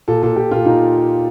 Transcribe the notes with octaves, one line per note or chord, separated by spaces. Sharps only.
A#2 A4
A#2 A4
A#2 G4
A#2 F4
A#2 D#4